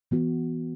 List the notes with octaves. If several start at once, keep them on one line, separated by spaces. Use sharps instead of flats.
E3 B3 F#4